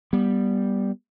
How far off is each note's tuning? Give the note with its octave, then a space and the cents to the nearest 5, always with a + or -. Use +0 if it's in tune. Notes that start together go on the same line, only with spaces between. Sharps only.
G3 +0 B3 -20